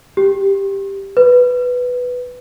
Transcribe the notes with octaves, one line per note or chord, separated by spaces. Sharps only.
G4
B4